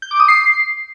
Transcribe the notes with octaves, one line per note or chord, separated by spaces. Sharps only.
G6
D6
D#6
C7